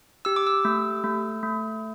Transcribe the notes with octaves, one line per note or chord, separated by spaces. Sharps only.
G4 E6
D6
E6
A3
A3
A3